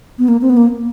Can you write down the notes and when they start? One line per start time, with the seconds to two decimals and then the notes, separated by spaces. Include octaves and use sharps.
0.19 B3
0.28 A#3
0.42 C4
0.50 B3
0.57 A#3